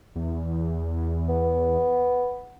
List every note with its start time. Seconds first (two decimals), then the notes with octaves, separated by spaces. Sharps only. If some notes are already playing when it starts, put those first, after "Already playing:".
0.16 E2
1.29 B3